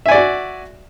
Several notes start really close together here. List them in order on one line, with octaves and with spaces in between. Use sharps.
E5 G#5 D5 F#4